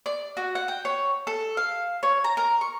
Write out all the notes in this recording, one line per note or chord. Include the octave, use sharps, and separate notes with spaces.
D5
F#4
F#5
G5
C#5
A4
F5
C#5
A#5
A#4
C#6